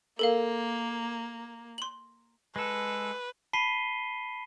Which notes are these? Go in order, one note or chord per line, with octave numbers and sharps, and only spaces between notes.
A#3 A4 A#4 F5
C6 F#7
G#3 A4 B4
A5 B5 B6 C7 D#7 G7